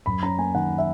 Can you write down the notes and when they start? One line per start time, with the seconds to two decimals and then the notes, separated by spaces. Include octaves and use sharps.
0.06 F#2 B5
0.23 C#4 A#5
0.38 A#3 G#5
0.55 D#3 F#5
0.78 E5